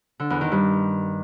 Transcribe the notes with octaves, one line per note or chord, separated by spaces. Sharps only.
D3
E2
D#3
G2